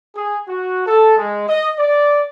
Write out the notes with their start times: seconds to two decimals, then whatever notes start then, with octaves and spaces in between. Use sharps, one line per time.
0.16 G#4
0.48 F#4
0.87 A4
1.17 G#3
1.49 D#5
1.79 D5